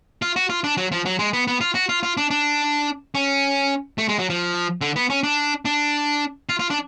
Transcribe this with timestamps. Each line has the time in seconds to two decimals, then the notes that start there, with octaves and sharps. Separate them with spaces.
0.22 F4
0.36 F#4
0.50 F4
0.64 D4
0.77 F#3
0.92 F3
1.06 F#3
1.19 G#3
1.33 B3
1.47 B3
1.61 F4
1.75 F#4
1.89 F4
2.03 F4
2.17 D4
2.31 D4
3.15 C#4
3.98 A3
4.09 G#3
4.19 F#3
4.30 F3
4.81 D3
4.96 B3
5.10 C#4
5.23 D4
5.65 D4
6.49 F4
6.59 F4
6.70 D4